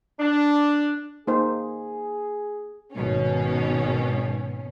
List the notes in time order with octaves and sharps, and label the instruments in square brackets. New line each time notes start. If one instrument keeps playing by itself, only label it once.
[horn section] D4
[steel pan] A#3 D#4 C5 [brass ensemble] G#4
[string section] G#1 B2 C#4